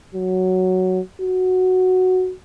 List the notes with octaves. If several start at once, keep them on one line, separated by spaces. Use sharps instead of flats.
F#3
F#4